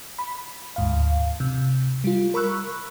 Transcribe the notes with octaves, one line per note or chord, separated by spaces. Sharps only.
B5
D2 G#2 F5
C3
G3 F4
A#4 B5 C#6 E6 F#6